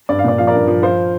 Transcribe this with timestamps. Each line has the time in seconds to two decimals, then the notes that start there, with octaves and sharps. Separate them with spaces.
0.09 G2 D5
0.19 F5
0.24 A#2 D5
0.38 F3 F5
0.47 A#4 D5
0.53 G2
0.67 F3
0.82 F3 C5 F5